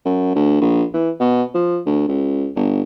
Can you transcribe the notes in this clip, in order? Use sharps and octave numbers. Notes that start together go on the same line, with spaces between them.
F#2
D2
A#1
E3
B2
F3
D2
C#2
G1